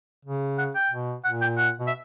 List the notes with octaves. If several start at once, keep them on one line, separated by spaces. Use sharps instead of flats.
C#3
F#5
G5
B2
A#2 F#5
G5
F#5
B2
E5